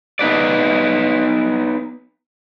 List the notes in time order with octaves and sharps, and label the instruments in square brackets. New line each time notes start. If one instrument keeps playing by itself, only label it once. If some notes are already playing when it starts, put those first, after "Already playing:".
[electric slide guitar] B3 D#4 B4 D5